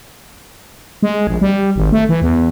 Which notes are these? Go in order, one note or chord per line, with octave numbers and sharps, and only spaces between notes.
G#3
A#1
G3
G#1
A3
E3
E2